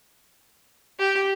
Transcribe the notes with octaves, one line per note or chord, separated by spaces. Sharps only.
G4